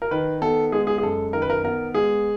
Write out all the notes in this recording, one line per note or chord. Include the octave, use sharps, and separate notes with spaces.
A#4
D#3 B4
B3 A4
G#3 G#4
G#4
G#4
F#2 A4
D#3 A#4
B4
A#4
B3 A#4
G#3 G#4